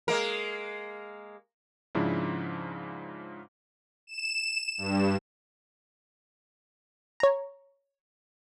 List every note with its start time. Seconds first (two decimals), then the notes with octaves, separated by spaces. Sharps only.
0.08 G#3 A#3 A#4
1.95 G#2 C#3 F3 D4 E4
4.07 E7
4.78 G2
7.20 C#5 A#5